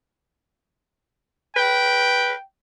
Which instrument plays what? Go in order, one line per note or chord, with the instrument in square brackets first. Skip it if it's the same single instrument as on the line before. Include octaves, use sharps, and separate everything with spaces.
[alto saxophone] B4 [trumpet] G5